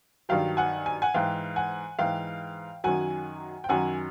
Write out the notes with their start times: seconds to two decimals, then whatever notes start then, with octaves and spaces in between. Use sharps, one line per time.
0.29 G2 D#3 F#3 F5 G5
0.57 F#5 G#5
0.86 G#5
1.02 F#5 G#5
1.14 G#2 E3 F5 G5
1.56 F#5 G#5
1.99 G#2 E3 F5 G5
2.84 F#2 D#3 F#3 F#5 G#5
3.64 G5
3.69 F#2 D#3 F#3 F#5 G#5